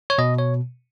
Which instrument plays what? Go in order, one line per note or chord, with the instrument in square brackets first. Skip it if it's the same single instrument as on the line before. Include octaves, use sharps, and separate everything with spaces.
[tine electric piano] C#5
B2 D#5
C#5